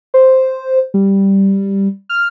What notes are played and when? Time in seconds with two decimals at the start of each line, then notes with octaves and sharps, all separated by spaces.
0.14 C5
0.94 G3
2.09 F6